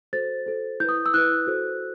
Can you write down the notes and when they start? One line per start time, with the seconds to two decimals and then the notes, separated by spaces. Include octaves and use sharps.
0.13 F#4 A4 C5 A6
0.46 F#4 A4 C5
0.80 E4 G6
0.84 B4 D#6
1.06 E6
1.14 E4 B4 F#6
1.47 F#4 A4 C5